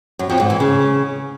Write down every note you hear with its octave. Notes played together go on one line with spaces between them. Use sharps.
F#2
F2
G#2
E3
C#3